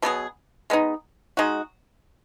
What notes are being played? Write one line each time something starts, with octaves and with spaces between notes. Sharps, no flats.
B2 F#3 B3 G#4
G#3 B3 D#4
G#3 D#4 F#4